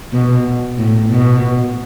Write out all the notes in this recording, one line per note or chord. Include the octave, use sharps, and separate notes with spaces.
B2
A2
B2